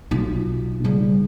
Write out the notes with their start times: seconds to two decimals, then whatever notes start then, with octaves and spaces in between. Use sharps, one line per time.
0.11 B1 F4
0.84 C#3 G3